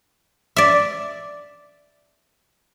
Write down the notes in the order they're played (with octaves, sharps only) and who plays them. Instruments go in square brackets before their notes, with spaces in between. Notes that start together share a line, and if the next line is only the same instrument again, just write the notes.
[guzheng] D5 E5